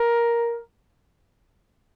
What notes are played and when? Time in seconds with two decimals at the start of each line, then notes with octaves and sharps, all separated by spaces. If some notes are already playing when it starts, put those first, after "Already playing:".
Already playing: A#4